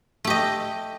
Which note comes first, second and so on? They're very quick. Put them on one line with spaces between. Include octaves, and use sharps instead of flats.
A3 G4 D#5